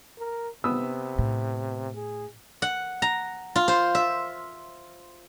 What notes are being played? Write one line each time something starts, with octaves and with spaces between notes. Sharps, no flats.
A#4
C3 B3 D#6 E6
A2
G#4
F#5
A#5
F4
C5
E5